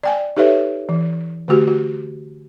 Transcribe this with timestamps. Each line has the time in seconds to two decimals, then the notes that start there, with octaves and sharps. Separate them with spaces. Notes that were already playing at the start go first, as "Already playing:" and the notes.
0.03 D5 G5 G#5
0.37 D#4 G4 A4 B4 C#5 E5
0.89 E3
1.48 D3 A3 F#4 G4
1.67 F#4